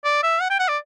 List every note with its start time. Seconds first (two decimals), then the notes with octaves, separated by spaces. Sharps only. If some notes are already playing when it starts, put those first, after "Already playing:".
0.05 D5
0.23 E5
0.41 F#5
0.50 G5
0.59 F#5
0.68 D5